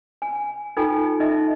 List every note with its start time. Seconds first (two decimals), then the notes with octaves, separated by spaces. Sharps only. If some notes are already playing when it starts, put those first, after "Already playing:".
0.22 G#5
0.77 D#4 F4 A4 G5 G#5
1.20 D#4 D#5 E5